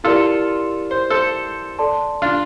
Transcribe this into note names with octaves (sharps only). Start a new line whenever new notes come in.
E4 F4 G4 A4 A#4 D5
C5
A4 C5
A4 D5 A5 C6
D4 F4